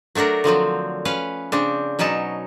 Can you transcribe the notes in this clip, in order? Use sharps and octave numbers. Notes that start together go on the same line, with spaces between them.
F#3 A3 D4 F#4 A#4
D3 F3 F#3 C4
C#4 B4 F5
C#3 C4 D4
B2 F#3 C#4 D#4 A5